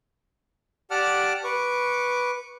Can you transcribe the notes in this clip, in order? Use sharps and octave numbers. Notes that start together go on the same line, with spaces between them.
G4 D5 F#5 A5 D6 F6
B4 C#6 D6